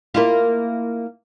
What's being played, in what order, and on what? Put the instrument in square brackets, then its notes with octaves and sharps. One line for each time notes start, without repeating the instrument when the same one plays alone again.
[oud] A#3 E4 F4